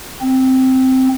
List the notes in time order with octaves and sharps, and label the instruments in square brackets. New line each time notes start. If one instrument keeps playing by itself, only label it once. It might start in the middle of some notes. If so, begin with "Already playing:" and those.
[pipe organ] C4